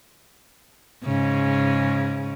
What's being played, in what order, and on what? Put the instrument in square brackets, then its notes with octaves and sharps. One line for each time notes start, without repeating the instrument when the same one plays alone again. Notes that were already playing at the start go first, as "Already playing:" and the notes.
[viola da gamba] G#2 C#3